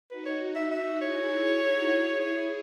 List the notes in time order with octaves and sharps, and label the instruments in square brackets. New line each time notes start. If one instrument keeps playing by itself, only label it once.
[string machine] D#4 F#4 [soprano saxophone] B4
[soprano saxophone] C#5
E5
E5
[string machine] E4 G#4 [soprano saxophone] C#5
[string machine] E4 G#4
D#4 F#4
E4 G#4
[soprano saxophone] C#5